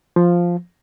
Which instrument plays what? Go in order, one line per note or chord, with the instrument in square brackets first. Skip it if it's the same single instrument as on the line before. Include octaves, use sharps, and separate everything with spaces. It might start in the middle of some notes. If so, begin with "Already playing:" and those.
[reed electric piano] F3